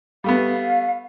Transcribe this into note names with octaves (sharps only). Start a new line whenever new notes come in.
G3 A3 B3 F5